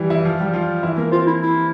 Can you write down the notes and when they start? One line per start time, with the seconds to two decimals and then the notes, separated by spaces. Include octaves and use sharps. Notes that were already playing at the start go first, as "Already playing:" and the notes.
Already playing: E3 G3 E4
0.10 E3 E4
0.25 F3 F4
0.39 G3 G4
0.53 F3 F4
0.83 E3 E4
0.97 A#3 A#4
1.11 C4 F4 C5
1.27 E4
1.41 E4